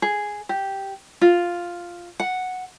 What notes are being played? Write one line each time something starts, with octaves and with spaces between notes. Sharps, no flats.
G#4
G4
F4
F#5